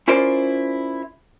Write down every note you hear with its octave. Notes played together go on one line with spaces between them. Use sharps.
C#4 E4 F4 A#4 C5 D5